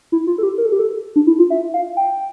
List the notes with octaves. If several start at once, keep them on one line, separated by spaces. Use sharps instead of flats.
E4
F4
A4
G4
A#4
A4
G4
A4
D4
E4
F4
E5
F5
G5